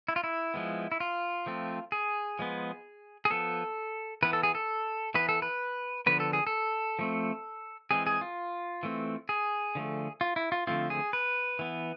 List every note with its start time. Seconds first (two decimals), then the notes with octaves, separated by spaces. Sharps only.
0.08 E4
0.16 F4
0.24 E4
0.54 F3 G#3 B3
0.92 E4
1.00 F4
1.46 F3 A3 C4
1.92 G#4
2.39 F3 G#3 B3
3.25 G#4
3.30 F3 B3 A4
4.23 E3 B3 B4
4.33 A4
4.43 G#4
4.55 A4
5.14 E3 B3 B4
5.29 A4
5.42 B4
6.06 D3 F3 B3 B4
6.20 A4
6.33 G#4
6.47 A4
6.99 F3 A3 C4
7.91 E3 G#3 C4 G#4
8.07 G#4
8.21 F4
8.83 E3 A3 C4
9.29 G#4
9.75 D3 F3 A3
10.21 F4
10.36 E4
10.52 F4
10.67 D3 F3 A3 C4 F4
10.90 G#4
11.13 B4
11.59 E3 B3